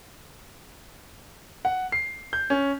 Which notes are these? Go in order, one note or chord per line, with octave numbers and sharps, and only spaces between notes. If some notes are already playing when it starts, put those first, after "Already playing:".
F#5
C7
G6
C#4